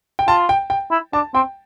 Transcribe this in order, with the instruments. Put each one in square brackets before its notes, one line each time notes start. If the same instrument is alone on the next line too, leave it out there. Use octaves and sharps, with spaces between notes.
[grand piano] G5
[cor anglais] F4 [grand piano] A5
[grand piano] G5
G5
[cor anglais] E4
[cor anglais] D4 [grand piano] A5
[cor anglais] C4 [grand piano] G5